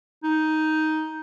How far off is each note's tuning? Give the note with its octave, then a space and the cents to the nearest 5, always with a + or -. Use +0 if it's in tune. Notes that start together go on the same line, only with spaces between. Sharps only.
D#4 +5